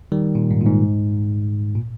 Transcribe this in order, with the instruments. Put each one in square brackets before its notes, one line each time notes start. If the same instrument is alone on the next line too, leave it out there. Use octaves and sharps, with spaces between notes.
[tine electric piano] D#3 G3
A#2
G#2
A#2
G#2
A#2